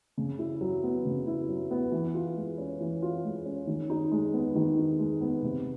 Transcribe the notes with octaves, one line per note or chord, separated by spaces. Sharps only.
C#3
E4
F#3
B3
C#3
E4
F#3
B3
E3
F4
G#3
C#4
E3
F4
G#3
C#4
D#3
D#4
G#3
B3
D#3
D#4
G#3
B3
C3